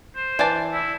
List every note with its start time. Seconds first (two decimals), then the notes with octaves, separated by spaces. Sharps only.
0.15 C5
0.39 E3 D5 A5
0.74 E4